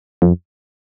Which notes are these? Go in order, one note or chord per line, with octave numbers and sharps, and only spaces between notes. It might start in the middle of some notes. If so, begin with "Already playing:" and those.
F2